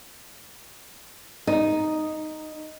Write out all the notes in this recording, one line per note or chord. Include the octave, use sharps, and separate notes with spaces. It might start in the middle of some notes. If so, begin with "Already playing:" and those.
D#4